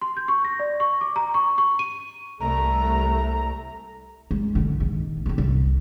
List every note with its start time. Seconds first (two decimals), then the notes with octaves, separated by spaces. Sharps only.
0.01 C6
0.17 G6
0.28 C#6
0.45 A#6
0.59 D5
0.80 C#6
1.01 D6
1.16 A#5
1.34 C#6
1.58 C#6
1.79 D#7
2.40 C2 A3 A#5
4.31 G#3
4.55 F#2 D3
4.80 A#1 D#3
5.26 A#1 D#3
5.38 C2